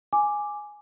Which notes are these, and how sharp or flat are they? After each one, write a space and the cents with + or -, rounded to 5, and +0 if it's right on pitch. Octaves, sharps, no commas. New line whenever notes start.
G#5 +0 D6 +0